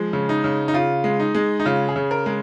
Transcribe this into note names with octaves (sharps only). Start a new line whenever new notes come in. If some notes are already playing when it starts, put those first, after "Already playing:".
Already playing: F3 G#3
C#3
D#4
C#3
D#4
C#3 F4
G#3
D#4
G#3
D#4
C#3 F4
G#4
C#3
A#4
G#3